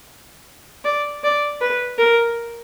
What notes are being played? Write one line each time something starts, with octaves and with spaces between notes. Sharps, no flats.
D5
D5
B4
A#4